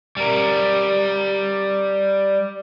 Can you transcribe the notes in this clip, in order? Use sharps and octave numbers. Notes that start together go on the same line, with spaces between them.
G3 A#4